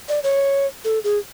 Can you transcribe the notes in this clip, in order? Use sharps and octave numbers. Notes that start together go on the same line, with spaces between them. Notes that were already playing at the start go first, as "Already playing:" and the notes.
D5
C#5
A4
G#4